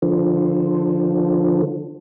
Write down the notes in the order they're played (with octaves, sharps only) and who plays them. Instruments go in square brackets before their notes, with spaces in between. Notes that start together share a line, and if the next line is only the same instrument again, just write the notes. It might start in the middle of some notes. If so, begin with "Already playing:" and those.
[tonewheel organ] D3 F3